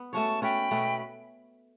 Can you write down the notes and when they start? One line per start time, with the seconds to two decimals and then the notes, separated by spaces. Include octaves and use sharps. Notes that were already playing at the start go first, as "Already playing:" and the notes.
Already playing: B3
0.13 A3 C#4 F#4 C#5 A5 C#6
0.42 A3 C#4 F#4 C#5 G5 B5
0.71 B2 A3 C#4 F#4